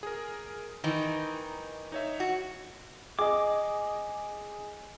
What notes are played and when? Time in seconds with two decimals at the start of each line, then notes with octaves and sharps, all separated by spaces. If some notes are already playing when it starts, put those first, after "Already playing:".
0.03 G#4 A#4
0.84 D#3 E3 D#4
1.92 D#4 C#5 E5
2.20 F#4
3.19 G#4 D#5 D6